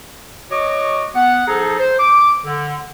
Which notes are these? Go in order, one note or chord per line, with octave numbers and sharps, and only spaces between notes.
F#4 C#5 D#5 D6
B3 F#5
F3 D#4 G#4 A4 A#5
C5
D6
D3